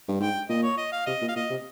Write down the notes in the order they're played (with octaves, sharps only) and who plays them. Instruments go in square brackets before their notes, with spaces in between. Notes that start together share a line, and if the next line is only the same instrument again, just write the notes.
[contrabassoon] G2
[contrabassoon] G#2 [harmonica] G5
[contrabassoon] A#2 [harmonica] D#5
[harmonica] C#5
D#5
F5
[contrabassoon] C3 [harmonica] D#5
[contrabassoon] A#2
[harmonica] F5
[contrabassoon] A#2 [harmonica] D#5
[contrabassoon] C3